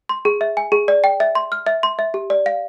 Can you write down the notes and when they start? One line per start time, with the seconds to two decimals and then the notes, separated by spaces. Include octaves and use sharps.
0.09 C6
0.25 G#4
0.41 E5
0.57 G#5
0.72 G#4
0.88 D5
1.04 G5
1.20 E5
1.35 C6
1.52 F6
1.67 E5
1.83 C6
1.99 E5
2.14 G4
2.30 D5
2.46 F5